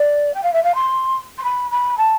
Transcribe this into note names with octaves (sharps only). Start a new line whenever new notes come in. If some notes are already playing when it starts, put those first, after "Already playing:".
Already playing: D5
G5
F5
E5
F5
C6
C6
B5
B5
A5